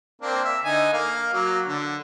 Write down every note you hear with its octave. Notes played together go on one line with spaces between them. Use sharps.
A#3 C4 D4
E5
D3 D#4 G#5
A#3 F5
F#3 A#3
D3